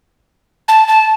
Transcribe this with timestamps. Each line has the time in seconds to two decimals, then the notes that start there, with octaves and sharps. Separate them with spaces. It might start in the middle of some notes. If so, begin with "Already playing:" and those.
0.68 A5
0.88 A5